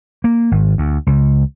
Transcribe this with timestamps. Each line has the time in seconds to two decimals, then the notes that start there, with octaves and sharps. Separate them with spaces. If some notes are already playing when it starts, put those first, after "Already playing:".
0.24 A#3
0.51 G#1
0.78 D2
1.07 C#2